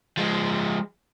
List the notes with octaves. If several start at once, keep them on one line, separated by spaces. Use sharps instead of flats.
F3 G#3